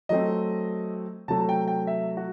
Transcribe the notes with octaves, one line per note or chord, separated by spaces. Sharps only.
F#3 A3 C4 D#5
C3 F#3 A3 A5
G5
G5
E5
F#4